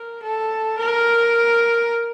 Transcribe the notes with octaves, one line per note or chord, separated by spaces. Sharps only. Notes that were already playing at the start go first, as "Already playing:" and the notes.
Already playing: A#4
A4
A#4